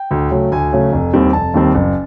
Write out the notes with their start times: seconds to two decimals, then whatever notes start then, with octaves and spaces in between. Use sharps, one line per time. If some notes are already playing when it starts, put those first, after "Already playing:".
Already playing: G5
0.11 D2
0.31 C#3 F#3 A3 C#4
0.52 D2 G#5
0.72 C#3 F#3 A3 C#4
0.92 F1
1.13 D#2 D#3 G3 C4
1.33 F1 A5
1.54 D#2 D#3 G3 C4
1.75 F#1